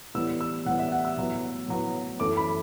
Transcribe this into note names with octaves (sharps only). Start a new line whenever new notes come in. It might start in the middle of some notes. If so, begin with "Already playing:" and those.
A2 E3 G3 B3 E6
E6
A2 E3 G3 B3 F#5
E5
F#5
E6
A2 F#3 B3
A2 F#3 B3
F#2 E3 A3 D6
B5